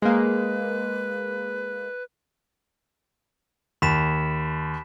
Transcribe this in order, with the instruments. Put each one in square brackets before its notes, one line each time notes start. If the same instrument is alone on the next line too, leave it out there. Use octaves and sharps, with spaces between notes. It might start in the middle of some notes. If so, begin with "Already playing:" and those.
[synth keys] G#3 A#3 [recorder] B4
[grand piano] D#2 [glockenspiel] B5 B6 E7